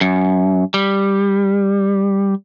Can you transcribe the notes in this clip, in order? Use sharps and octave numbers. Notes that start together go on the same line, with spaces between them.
F#2
G3